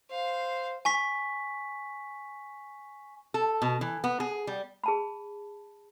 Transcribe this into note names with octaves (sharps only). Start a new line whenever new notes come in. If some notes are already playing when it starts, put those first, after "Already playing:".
C5 F5
G#5 C#6 B6
A4
B2
E3
B3
G#4
G3
G#4 A5 B5